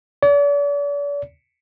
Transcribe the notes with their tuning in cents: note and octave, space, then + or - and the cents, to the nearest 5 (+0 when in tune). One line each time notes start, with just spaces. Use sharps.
D5 -40